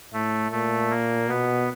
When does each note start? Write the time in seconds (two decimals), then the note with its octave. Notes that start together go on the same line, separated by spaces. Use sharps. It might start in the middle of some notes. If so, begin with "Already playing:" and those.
0.13 A2 A3
0.51 A#2 A3
0.90 A#3
1.29 B2 B3